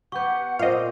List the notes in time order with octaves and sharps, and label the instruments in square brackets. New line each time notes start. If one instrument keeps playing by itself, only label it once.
[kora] B3 G4 [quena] F#5 [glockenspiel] C#6 G6
[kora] A#2 C4 [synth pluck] D#5 F5